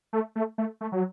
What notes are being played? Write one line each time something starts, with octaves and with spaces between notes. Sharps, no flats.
A3
A3
A3
A3
F#3